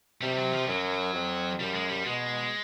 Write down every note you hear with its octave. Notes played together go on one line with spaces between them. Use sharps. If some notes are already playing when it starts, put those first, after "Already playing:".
C3 G3
F3
F#3
F3
F#2 F#3
F2
F#2 G3
G#3
G3
B2 G#3